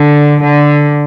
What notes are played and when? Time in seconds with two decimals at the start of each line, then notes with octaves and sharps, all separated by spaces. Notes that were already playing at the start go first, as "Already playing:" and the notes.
Already playing: D3
0.41 D3